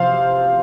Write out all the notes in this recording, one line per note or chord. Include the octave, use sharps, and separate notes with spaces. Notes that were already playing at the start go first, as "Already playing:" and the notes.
Already playing: C3 F3 C5 F5